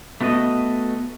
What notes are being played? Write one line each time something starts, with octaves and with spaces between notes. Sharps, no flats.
A3 B3 F#4 D5 D#5